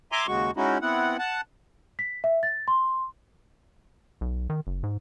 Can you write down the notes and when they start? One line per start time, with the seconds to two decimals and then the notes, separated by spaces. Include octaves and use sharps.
0.12 E5 G#5 A#5 C6 D6
0.28 D#2 C#3 G#3 F#4 C#6
0.57 G#3 C#4 D#4 E4 F#4
0.81 B3 C4 E4 F#5
1.19 F#5 A5
1.99 B6
2.24 E5
2.43 A6
2.68 C6
4.21 B1
4.50 D#3
4.67 F#1
4.83 G#2